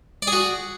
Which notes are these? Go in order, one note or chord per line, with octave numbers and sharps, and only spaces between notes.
F#4 G#4 D5